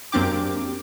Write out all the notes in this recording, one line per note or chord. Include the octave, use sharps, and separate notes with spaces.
F#2 A#3 C4 D4 G4 D6